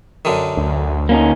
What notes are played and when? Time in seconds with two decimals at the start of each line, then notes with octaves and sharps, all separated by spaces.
0.25 F#2 D3 D#3
0.57 D2
1.09 A#3 C#4 D#4